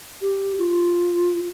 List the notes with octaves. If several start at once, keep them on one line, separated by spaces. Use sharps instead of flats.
G4
F4